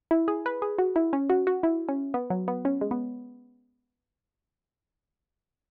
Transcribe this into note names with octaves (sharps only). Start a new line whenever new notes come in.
E4
G#4
B4
G#4
F#4
E4
C#4
F#4
F#4
E4
C#4
B3
F#3
B3
C#4
G#3
B3